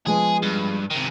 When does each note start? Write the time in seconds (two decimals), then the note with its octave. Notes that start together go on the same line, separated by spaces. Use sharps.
0.07 F3 G#3 B3 G#4
0.43 G2
0.90 C3 D#3